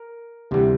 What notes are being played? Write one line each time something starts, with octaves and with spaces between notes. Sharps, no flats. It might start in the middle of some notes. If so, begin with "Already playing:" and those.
Already playing: A#4
D2 C3 E3 G3